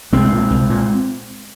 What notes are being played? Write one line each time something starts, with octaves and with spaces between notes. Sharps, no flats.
C2 G#3 C4
A#2
C2
A#2